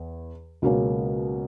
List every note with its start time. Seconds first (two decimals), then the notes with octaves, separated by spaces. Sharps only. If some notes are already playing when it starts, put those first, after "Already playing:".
Already playing: E2
0.62 C#2 B2 F#3 A#3 C#4